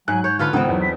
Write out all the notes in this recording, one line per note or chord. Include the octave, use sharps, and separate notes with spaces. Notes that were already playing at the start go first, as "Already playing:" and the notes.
G#2 F#3 G#5 F#6
C#5 G6
D3 F4 A4 B4 F6
G#1 C#2 B3 C4 D#4 F#5
E2 F#3
B6